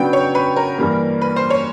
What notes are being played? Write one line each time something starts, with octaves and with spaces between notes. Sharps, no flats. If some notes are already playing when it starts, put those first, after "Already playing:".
Already playing: C#3 F#3 B3 D4 F#4 G5
C#5
B4
A#4
G2 E3 G3 A#3
B4
C5
C#5